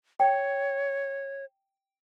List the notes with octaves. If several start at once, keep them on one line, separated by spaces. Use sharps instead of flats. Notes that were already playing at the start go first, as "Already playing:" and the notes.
C#5 G5